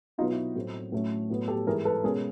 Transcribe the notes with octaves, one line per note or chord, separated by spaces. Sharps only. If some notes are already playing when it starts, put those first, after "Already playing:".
B2 F#3 B3 D#4 F4
E4 F#4
A2 F#3 A3 C4
A2 F#3 A3 C#4
A2 F#3 B3
G4 A4
G#2 E3 G3 G#4 A#4
A4 B4
B2 G#3 C#4 G#4 A#4